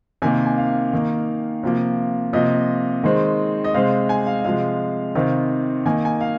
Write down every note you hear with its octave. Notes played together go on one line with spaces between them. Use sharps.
C3 D#3 A#3 G#5
G#5
F5
D#3 A#3
C3 F3 A#3
C3 F3 A#3 D#5
D#3 G#3 C4
D#5
C3 G#3 C4 F5
G#5
F5
C3 F3 G#3 F5
C3 D#3 C4 F5
D#3 A#3 G#5
G#5
F5